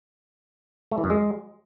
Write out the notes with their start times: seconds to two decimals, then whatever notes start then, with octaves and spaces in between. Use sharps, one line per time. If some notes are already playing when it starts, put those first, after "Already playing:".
0.91 A3
0.98 E3
1.04 F#2
1.10 G#3